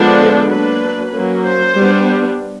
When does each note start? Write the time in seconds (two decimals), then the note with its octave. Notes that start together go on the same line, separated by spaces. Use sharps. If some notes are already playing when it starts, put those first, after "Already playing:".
Already playing: D3 F3 G#3 B3 D4
0.20 A4
0.50 F#3 A#3 D4 B4
1.13 F#3 A#3 C#4
1.45 C5
1.75 G3 B3 D4